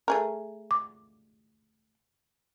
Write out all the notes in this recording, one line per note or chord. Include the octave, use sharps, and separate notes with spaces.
A3 G#4 A#4
D6